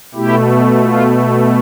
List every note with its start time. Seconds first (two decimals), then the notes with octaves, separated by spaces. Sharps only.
0.15 B2 A3 E4 G4
0.83 F4